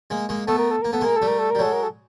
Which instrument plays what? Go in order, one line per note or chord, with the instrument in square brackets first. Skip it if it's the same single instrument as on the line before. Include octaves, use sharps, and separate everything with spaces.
[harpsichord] G#3 A#3
G#3 A#3
[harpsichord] A3 B3 [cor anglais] A4
[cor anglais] A#4
A4
[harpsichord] A#3 [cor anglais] A#4
[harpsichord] B3 [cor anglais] A4
[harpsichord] G#3 A#3 [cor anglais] A#4
[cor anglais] A4
[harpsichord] G3 A3
[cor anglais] A#4
A4
[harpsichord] G3 [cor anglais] A#4
[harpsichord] F#3 G#3 [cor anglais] A4
[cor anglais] A#4
A4